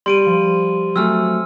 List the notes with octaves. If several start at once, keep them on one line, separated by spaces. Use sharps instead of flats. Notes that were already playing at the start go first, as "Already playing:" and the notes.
G3 C6 D7 D#7
F3
F#3 A3 C4 G#5 E6 F6 C#7